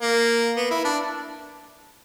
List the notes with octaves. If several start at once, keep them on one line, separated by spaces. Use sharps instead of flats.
A#3
B3
E4
D4